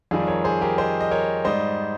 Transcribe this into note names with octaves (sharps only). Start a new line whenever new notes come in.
F2 D#3 G3 F4 G#4
A#4 C#5
G#4 C5
G4 A#4
C5 D#5
D#5
A#4 C#5
G#2 G3 C5 D#5